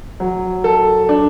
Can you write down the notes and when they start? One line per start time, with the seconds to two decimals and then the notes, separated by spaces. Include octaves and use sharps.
0.20 F#3
0.64 A4
1.09 D4